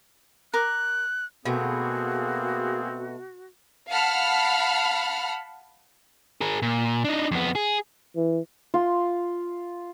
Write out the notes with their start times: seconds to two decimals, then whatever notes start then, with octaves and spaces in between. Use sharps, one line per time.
0.54 A#4 D6 F#6
1.45 B2 A3 A#3 C4 F#4 G#4
3.88 F5 F#5 A5 B5 F6
6.41 G#4 A#4
6.62 A#2
7.04 D4 D#4
7.31 F2 B3
7.55 G#4
8.16 E3
8.74 F4 C6